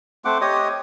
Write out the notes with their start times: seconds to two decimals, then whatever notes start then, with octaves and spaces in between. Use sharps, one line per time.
0.25 A3 C4 F#5 D6
0.41 G4 C#5 D#5 D#6